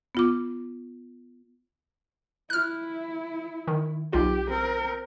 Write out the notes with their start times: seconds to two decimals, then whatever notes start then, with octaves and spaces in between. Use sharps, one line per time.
0.15 B3 F4 D6
2.50 E4 F6 F#6
3.67 D#3
4.13 B1 F4 G4
4.48 C4 A#4